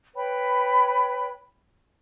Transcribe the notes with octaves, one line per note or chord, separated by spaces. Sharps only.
B4 C#5 G5 B5